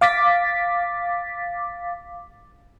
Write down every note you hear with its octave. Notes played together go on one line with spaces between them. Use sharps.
F5 D6 A6 B6